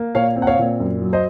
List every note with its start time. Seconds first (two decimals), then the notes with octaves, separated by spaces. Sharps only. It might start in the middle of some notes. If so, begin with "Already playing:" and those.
Already playing: A#3
0.15 A#2 C#5 F5
0.36 C4
0.42 F#5
0.47 C#5 F5
0.59 A#2
0.80 F#2
1.02 F#3
1.13 C5 D#5